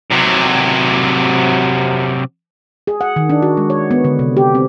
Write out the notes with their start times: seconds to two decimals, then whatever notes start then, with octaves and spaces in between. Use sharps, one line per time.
0.11 C3 F#3
2.87 G#4
3.01 F#5
3.16 D#3
3.30 D4
3.42 F#4
3.57 G#3
3.70 C#5
3.91 B3
4.04 D3
4.19 C3
4.37 G4
4.55 C4